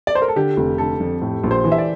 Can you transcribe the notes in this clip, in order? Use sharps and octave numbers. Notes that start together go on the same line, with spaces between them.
D5
C5
A#4
A4
D3 G4
F1
D3 A4
F2
A2
A#1
C5
E3
E5
D5